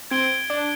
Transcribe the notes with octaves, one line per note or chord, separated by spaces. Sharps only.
C4 G#6 D7 G7
D4